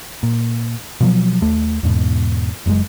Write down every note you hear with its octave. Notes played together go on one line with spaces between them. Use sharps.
A#2
B2 F3 F#3
D#2 A3
E2 G#2 B2
F#1 F#2 C3 G#3